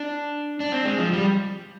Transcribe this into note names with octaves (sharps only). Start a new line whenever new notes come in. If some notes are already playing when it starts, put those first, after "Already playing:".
Already playing: D4
D4
C4
G#3
F3
G3